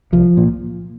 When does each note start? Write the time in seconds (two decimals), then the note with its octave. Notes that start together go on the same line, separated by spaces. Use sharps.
0.12 C2 F3
0.37 A#2